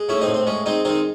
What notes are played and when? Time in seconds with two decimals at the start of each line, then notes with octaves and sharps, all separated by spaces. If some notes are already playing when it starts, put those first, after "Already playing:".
Already playing: G#3
0.09 A2 C#4 E4
0.21 C4 D#4
0.27 A2
0.34 C4
0.47 G#3 C#4
0.66 G#3 C4 D#4
0.85 D#3 C4 D#4